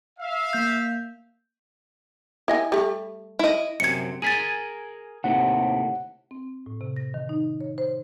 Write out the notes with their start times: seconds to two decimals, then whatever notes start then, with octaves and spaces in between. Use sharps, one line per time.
0.19 E5 F5
0.53 A#3 G6
2.48 E4 D#5 G#5
2.72 G3 A3
3.39 E4 D#5
3.80 F#2 C3 G#6 C#7
4.22 G#4 A#4 G#5 A6 B6 D#7
5.24 D#2 A2 C3 F#5
6.31 C4
6.66 A2
6.81 C3
6.96 A#6
7.14 D#3
7.29 D#4
7.61 C#5
7.78 C5